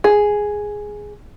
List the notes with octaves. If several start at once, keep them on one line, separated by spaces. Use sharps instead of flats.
G#4